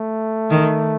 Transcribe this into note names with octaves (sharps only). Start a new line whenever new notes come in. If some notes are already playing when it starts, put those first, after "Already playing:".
Already playing: A3
D#3